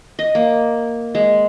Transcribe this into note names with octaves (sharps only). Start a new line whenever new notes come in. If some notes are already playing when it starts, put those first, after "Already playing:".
D#5
A#3
G#3